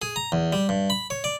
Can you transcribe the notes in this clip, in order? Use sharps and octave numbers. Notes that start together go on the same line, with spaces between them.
G#4
A#5
E2
G3
G2
B5
C#5
D5